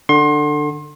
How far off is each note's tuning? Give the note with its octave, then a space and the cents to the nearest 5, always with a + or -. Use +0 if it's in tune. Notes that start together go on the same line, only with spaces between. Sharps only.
D3 +15 C6 +30